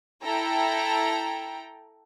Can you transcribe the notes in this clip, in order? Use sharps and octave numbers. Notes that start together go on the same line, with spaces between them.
E4 A4 G5 A#5